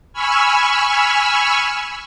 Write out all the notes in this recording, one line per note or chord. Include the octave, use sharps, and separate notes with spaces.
G#5 B5 C#6 E6 F6